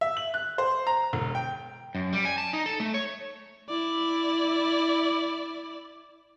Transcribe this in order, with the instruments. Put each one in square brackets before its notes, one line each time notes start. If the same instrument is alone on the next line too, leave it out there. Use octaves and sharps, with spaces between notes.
[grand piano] E5
F#7
F#6
C5
A#5
E1
G5
[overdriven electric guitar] F#2
G3
G#5
A5
D#4
A4
A3
C#5
[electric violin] E4 D5